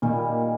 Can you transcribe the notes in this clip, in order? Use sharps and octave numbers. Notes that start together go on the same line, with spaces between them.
A#2 D#3 G3